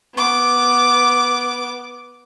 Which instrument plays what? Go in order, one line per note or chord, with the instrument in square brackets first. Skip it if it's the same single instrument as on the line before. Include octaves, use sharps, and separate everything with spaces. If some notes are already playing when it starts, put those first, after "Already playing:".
[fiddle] B3 D6